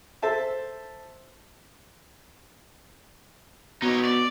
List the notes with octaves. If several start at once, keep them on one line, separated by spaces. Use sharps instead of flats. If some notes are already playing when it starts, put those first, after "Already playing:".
A4 C5 E5 A5
B2 D#4 C#5
D5